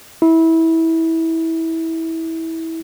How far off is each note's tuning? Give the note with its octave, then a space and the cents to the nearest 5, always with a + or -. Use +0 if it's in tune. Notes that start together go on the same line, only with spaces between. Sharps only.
E4 -20